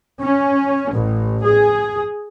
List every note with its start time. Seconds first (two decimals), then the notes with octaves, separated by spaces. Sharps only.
0.22 C#4
0.92 A1
1.45 G#4